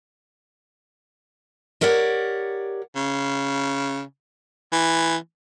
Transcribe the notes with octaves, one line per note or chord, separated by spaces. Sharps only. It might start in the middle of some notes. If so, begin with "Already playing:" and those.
G4 A#4 C#5 D5 F#5
C#3
E3